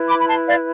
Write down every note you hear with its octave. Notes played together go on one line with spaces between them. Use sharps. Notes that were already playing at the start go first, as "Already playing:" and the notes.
Already playing: E4 B4
B5 D6
B5
A5 C6
D5 F5